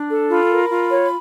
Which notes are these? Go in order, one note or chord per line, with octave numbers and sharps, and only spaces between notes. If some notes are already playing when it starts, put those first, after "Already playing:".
Already playing: D4
A4
F4 B5
A#4
F4
C#5